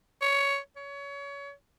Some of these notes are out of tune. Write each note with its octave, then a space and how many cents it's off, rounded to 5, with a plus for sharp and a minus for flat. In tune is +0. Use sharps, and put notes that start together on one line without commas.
C#5 +10
C#5 +25